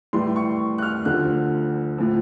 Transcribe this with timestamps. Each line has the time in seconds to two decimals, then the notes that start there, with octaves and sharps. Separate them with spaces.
0.13 A2 E3 G3 C6
0.36 C#6
0.78 F#6
0.82 F6
1.05 D2 D3 F3 F#6
1.98 A2 F3